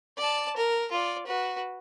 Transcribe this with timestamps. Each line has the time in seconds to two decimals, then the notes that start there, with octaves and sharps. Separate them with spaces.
0.17 D5 A5
0.56 A#4
0.91 F4 D5
1.26 F#4 B4